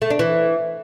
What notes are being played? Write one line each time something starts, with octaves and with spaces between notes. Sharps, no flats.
A3
D4
E3